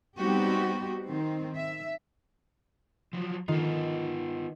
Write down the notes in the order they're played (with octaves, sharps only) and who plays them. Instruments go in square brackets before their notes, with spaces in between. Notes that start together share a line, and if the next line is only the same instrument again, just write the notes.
[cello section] G3 B3 C4 D#4 F#4 G4
D#3 C4
E5
[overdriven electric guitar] F3 F#3
[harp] D#3 [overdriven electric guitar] B3 F4